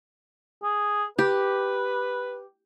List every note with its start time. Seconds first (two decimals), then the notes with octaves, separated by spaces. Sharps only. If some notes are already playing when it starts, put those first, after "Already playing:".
0.63 G#4
1.19 G4 B4